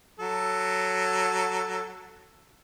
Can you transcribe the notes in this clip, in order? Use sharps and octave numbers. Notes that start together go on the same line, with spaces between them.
F#3 A4